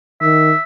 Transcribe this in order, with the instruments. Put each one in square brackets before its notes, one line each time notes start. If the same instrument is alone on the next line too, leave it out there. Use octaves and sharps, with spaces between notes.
[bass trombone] D#3 [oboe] E5